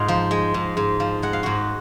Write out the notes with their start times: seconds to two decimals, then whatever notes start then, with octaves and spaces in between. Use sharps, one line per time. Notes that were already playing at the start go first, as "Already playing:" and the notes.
Already playing: G#2 G#3 D#4 F4 F5
0.08 F3
0.31 G#3
0.54 G#2
0.77 G#2
1.00 F3
1.22 G#3 F#5
1.33 F5
1.43 G#2 F#4 F#5